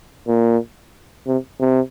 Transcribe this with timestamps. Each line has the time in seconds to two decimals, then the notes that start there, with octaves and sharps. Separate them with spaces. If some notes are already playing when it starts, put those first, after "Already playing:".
0.27 A#2
1.27 C3
1.60 C3